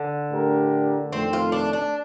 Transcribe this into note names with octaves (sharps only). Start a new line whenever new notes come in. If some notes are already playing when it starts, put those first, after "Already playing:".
Already playing: D3
A2 A3 D4 G4 A#4
F2 D#3 A3 C4
F4
D4
D4